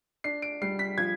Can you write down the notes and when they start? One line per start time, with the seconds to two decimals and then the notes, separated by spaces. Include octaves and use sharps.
0.24 D4 C7
0.42 D7
0.62 G3 C7
0.79 B6
0.98 F3 G#6